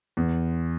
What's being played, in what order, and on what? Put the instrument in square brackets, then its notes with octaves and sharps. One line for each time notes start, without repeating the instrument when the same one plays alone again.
[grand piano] E2